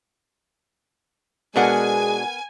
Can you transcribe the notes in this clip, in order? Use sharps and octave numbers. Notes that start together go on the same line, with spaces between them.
B2 G#3 B3 D4 A#4 F#5 G#5